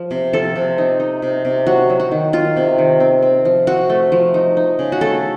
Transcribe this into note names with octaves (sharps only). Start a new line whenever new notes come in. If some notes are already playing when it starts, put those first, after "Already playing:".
Already playing: F3
C3
F3 A4
C3
D#4
D#4
C3
C3
F#3 F#4
F#3
F#4
D#3
D#3 F4
C3
D#3
C4
C4
F3
C4 F#4
A3
F3
D#4
D#4
C#3
F#4
A3 A4